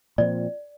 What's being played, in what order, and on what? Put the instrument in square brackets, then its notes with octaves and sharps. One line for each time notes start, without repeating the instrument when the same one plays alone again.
[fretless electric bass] A#2 F3 C4 [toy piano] D5